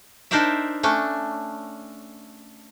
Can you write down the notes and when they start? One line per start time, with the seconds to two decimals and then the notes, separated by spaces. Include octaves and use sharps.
0.31 D4 D#4 A#4 C5 D5 E5
0.83 A3 C#4 D4